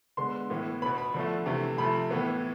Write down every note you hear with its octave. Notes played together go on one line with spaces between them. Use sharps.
D3 G#3 B3 C6
A2 E3 B3
B2 B3 B5
B5
D3 F3 A3
C3 E3 A3
C3 F3 A3 B5
A2 E3 B3